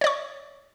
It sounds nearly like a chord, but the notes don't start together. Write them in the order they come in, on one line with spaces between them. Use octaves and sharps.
C#5 D5 C#6